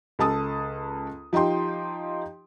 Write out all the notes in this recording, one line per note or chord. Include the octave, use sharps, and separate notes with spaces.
C#2 A4 A5 D#6
F3 D#4 G4 G5 C6